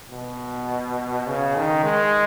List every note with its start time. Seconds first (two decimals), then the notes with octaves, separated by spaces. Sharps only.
0.12 B2
1.27 C#3
1.56 D#3
1.84 G#3